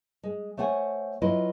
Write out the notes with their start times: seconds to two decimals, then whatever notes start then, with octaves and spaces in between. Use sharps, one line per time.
0.23 G#3
0.57 A3 C5 C#5 F#5 G#5
1.22 F#3 E4 F4 B4 D#5